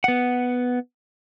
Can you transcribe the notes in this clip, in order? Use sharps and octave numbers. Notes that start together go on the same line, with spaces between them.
B3 F#5